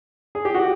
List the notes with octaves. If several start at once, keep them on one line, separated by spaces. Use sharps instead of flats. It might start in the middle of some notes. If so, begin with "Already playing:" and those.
G#4
G4
F#4